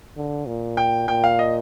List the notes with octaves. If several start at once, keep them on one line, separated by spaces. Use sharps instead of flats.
D3
A#2
G5
A#2 G5
F5
D#5